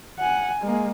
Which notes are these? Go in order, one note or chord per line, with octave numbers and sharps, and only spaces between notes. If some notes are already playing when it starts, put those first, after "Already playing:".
F#5 G#5
G#3 A#3